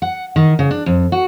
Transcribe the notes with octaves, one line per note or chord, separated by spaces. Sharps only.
F#5
D#3
C#3
D4
F2
F#4